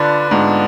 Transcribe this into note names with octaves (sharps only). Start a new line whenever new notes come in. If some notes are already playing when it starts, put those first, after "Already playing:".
Already playing: D3 D4 F4 B4 D5
G#2 B3 D4 F4